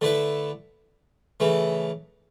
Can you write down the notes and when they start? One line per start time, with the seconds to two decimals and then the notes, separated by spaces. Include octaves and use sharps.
0.01 D3 A3 E4 B4
1.40 C#3 E3 A3